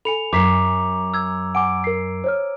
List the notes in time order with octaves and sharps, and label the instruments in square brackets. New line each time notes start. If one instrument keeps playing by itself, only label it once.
[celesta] A4 B5 [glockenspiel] G#5 C#7 F7
[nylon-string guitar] F#2 [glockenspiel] A#5 D6 [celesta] C6 B6 C7
[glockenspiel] E6 G#6
[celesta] F#5 G#5 D6 [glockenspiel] D7
[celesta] A#4 C7
C5 C#5 F6